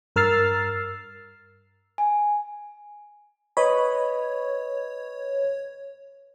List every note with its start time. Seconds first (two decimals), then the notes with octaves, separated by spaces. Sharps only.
0.16 G2 A#4 E6 F6 A6 C7
1.98 G#5
3.57 B4 C#5 D#5 B5